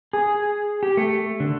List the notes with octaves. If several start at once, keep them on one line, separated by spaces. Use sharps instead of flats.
G#4
G4
A3
D3